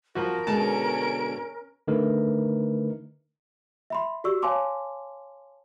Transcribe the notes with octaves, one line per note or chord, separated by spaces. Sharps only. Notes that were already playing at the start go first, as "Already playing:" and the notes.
F3 F#4 A#4
B2 D3 G#3 C#4 A5 D7
D3 A3 D#4 A#4 B4
E5 B5 C6
F#4 G4 D5 C#6 E6
C#5 F5 G#5 A5 C6 D6